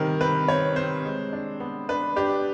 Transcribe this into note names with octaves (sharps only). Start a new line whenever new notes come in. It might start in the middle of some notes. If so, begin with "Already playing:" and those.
Already playing: C3 D#3 G3 A#4
C4 B4
C4 C#5
C4 C5
G#3
D4
B3
D4 B4
D4 G4